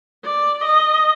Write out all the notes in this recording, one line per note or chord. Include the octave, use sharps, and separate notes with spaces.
D5
D#5